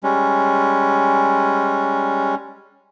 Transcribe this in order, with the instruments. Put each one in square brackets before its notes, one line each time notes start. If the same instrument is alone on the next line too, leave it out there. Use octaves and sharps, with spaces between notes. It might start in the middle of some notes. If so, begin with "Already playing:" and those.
[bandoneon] G3 G#3 C#4